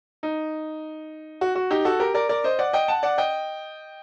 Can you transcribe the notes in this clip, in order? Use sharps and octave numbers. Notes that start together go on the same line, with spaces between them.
D#4
F#4
F#4
D#4 G4
F#4 A4
G4 A#4
A#4 D5
A#4 D5
C5 D#5
D5 F#5
D#5 G5
F#5 A5
D5 F#5
D#5 G5